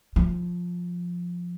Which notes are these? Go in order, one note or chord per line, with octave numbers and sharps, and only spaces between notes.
F3